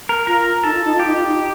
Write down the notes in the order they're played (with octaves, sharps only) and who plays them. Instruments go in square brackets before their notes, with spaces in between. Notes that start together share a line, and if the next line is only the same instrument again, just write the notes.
[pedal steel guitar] A#4
[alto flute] F4 [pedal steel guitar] A#4
[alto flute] D#4 [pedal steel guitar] A4
[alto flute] F4
D#4
[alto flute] F4 [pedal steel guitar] G4
[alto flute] D#4
F4
D#4